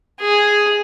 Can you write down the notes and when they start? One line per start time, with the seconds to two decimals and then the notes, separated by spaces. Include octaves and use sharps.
0.21 G#4